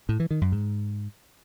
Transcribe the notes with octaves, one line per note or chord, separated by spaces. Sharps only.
A2
E3
D#3
F#2
G#2